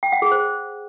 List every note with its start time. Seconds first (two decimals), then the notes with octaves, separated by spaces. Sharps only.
0.03 G5
0.12 F#5
0.22 G#4
0.32 C5